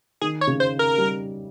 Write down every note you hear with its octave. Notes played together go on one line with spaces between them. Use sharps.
D#3 G#4
C#5
C#3
C5
A#4
G3